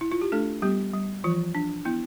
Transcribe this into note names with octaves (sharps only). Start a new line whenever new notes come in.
E4
F4
G4
A3 D4 A4
G3 B3 G4
G3
E3 F3 F4
D4
B3 E4